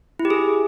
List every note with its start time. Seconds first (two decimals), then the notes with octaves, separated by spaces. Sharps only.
0.19 E4
0.25 G4
0.30 G#4